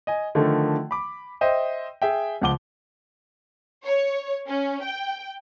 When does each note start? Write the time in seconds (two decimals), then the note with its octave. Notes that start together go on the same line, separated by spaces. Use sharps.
0.07 D#5 G#5
0.35 D3 D#3 F3 A3
0.91 B5 D6
1.41 C5 D#5 E5 G5
2.02 G#4 E5 G5
2.41 C#2 F3 F#5 D6 G7
3.84 C#5
4.48 C#4
4.83 G5